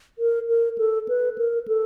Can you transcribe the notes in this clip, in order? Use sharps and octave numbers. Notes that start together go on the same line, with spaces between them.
A#4
A#4
A4
B4
A#4
A4